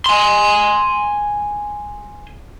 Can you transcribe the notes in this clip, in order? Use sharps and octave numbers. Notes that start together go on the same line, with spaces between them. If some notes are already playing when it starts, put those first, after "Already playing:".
G#5 C6